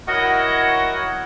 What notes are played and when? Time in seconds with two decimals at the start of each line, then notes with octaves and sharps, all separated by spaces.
0.08 E4 F#4 A#4 C#5 D#5 F#5